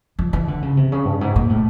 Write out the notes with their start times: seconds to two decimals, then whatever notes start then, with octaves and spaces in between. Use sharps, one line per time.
0.19 F3
0.33 E3
0.48 D3
0.62 C#3
0.77 C3
0.92 C#3
1.05 G2
1.21 G#2
1.36 A#2
1.49 A2